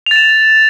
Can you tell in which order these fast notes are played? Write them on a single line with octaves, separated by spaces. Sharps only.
F7 A6 E7